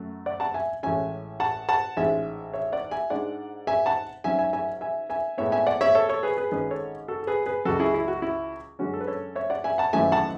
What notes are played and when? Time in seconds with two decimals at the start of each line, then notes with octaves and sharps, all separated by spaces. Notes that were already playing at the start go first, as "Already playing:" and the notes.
Already playing: F#2 F#3 A3
0.26 D5 F#5
0.40 F#5 A5
0.54 E5 G#5
0.83 A1 A2 G#3 C#4 E5 G#5
1.40 F#5 A5
1.69 F#5 A5
1.97 A1 G#2 G#3 C#4 E5 G#5
2.53 C#5 E5
2.72 D5 F#5
2.91 E5 G#5
3.10 G#2 G#3 D4 D5 F#5
3.67 E5 G#5
3.86 F#5 A5
4.24 G#2 F#3 C#4 E5 G#5
4.39 E5 G#5
4.53 E5 G#5
4.81 E5 G#5
5.10 E5 G#5
5.38 A2 G#3 B3 C#5 E5
5.52 E5 G#5
5.67 D5 F#5
5.81 C#5 E5
5.95 A4 C#5
6.09 A4 C#5
6.23 G#4 B4
6.37 G#4 B4
6.52 G#1 G#2 G#3 C#4 G#4 B4
6.71 A4 C#5
7.08 F#4 A4
7.23 A4
7.27 G#4 B4
7.46 G#4 B4
7.65 C#2 C#3 F#3 F#4 A4
7.80 E4 G#4
7.94 E4
8.08 F#4
8.22 E4
8.79 F#2 D3 G#3 C#4 F#4
8.94 A4
9.00 B4
9.08 A4 C#5
9.35 C#5 E5
9.50 D5 F#5
9.64 E5 G#5
9.78 F#5 A5
9.93 G#1 F#2 E3 A3 E5 G#5
10.12 F#5 A5